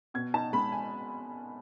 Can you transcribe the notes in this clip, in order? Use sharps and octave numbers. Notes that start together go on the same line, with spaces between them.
B2 G#6
D#4 A5
G#3 B5
G#5